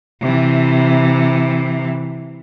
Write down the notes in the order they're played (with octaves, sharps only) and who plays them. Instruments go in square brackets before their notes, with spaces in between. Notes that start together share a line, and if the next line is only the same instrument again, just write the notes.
[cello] C3 E3